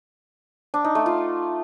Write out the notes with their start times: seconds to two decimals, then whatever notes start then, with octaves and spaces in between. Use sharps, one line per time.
0.74 D4
0.84 D#4
0.95 A3
1.06 F4